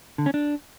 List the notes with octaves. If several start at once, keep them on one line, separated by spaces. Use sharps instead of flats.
D3
C#4
D4